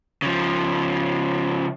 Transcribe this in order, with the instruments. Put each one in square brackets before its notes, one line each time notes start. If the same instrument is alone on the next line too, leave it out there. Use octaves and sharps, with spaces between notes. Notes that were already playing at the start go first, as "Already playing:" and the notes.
[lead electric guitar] C#3 F3